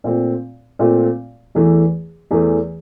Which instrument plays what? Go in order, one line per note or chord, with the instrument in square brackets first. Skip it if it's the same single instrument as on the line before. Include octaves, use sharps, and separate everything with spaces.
[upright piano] A#2 A3 C4 F4
A#2 A3 C4 F4
E2 E3 A3
E2 E3 A3